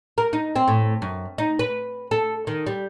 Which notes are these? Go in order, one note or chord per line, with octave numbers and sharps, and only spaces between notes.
A#4
D#4
C4
A2
F#2
D#4
B4
A4
D#3
G3